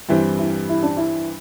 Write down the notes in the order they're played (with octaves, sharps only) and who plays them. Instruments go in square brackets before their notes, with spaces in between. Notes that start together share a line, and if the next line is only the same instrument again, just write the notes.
[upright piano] G2 E3 G3 C4 [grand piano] E4
[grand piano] E4
E4
D4
E4